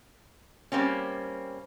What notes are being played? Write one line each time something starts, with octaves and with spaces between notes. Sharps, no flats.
G3 A#3 C4 C#4